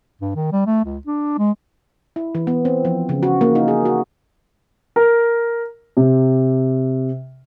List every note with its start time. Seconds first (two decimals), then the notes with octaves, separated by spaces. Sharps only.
0.21 G2
0.35 D#3
0.52 G3
0.66 A3
0.85 C#2
1.07 D4
1.38 G#3
2.16 E4
2.35 E3
2.47 B3
2.65 C4
2.85 F3
3.09 C#3
3.23 F#4
3.41 A#3
3.55 D#4
3.68 G#4
3.85 F#4
4.96 A#4
5.97 C3